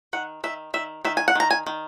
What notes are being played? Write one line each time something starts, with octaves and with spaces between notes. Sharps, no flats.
D#3 F#5
D#3 E5
D#3 E5
D#3 E5
G#5
F#5
D#3 A#5
G#5
D#3